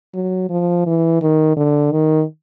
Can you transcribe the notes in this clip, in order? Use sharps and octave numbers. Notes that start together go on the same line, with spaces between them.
F#3
F3
E3
D#3
D3
D#3